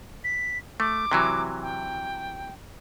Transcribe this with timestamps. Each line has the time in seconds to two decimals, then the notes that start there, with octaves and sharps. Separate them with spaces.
0.24 B6
0.80 A3 D6
1.12 C3 E3 F#3
1.62 G5